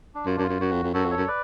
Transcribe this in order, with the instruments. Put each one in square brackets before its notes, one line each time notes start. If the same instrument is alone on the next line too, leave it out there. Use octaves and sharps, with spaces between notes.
[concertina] D4
[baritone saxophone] F#2 [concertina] F4
[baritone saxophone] F#2 [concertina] D4
[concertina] F4
[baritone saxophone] F#2
[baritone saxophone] F#2 [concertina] F#4
[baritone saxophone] F2
F2
[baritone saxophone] F#2 [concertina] F#4 A4
[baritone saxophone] F2
[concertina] A4 C#5
[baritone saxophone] F#2
[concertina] B4 D5